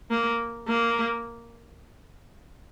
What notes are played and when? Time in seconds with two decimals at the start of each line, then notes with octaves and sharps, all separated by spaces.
0.10 A#3
0.68 A#3